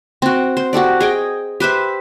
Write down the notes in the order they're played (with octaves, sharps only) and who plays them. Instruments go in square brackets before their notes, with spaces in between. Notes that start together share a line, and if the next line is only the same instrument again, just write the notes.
[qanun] C4 F#4
C5
F#4 G4 A4 D5
G#4 D#5 G5
G4 B4 C5 E5